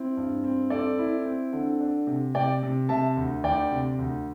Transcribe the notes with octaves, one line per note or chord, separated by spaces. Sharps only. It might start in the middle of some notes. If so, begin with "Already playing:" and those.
Already playing: C4 E4
G2
C4
C4 A4 D5
E4
C4
D3
D4
C3
C3 D5 G5
C3
C3 E5 A5
D2
D2 D5 G5
C3
D2